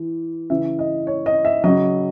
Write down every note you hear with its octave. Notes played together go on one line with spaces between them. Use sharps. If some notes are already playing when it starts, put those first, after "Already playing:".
Already playing: E3
C#3 E3 E5
D#5
C#5
D#5
E5
C#3 F#3 D#5